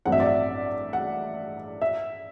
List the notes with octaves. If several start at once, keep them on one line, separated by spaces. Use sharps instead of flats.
A1 G2 F#3 C4 F#5
E5
D5
E5
F#5
E5